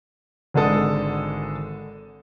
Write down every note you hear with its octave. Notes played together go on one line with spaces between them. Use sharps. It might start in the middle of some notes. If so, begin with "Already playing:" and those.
G#1 D3 G#3 A4 D#6